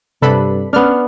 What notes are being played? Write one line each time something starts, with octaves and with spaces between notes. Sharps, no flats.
G2 C3 D4 A4 B4 B5
B3 C#4 D4 F6